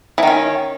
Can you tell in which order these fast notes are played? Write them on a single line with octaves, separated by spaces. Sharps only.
E3 D#3 C#4